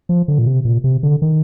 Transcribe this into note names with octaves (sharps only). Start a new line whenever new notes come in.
F3
D3
A#2
C3
A#2
C3
D3
D#3